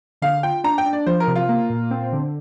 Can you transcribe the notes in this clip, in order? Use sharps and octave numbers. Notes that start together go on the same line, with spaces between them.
D3 F5
F4 G5
D4 A#5
G5
D4
D5
F3 C5
A#4
C3
F4
A#3
A#2
C4
D3